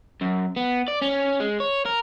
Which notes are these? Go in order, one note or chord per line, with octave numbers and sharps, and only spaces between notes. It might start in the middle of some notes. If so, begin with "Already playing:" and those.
F#2
B3
D5
C#4
G#3
C#5
A#4